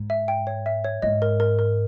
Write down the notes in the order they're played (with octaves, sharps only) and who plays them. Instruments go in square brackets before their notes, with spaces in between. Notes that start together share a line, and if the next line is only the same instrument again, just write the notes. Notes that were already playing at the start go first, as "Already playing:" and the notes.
Already playing: [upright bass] G#2
[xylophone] E5
G5
C#5
E5
C#5
[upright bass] G#2 [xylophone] D#5
[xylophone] A#4
A#4
A#4